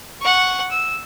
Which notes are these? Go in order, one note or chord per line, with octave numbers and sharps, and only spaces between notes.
F#5 C#6
E6